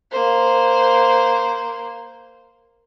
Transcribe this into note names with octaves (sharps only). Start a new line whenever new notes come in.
A#3 C5